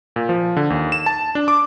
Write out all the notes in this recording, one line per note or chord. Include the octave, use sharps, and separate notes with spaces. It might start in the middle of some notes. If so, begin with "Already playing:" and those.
A#2
F3
D3
D#2
E7
A5
D4
D6